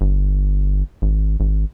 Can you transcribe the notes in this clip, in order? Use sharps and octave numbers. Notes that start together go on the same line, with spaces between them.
G1
G#1
G#1